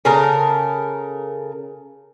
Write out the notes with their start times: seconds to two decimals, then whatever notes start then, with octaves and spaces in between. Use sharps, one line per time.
0.05 C#3 A4 A#4 A#5